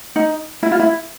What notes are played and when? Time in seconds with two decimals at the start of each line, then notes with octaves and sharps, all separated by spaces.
0.16 D#4
0.63 E4
0.72 F4
0.79 E4